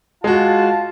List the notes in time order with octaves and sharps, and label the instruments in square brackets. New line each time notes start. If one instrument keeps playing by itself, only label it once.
[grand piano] G#3 F#4 [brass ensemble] F4 F5 A5